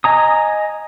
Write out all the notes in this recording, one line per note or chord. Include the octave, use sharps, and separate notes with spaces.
D#5 G#5 A#5 D#6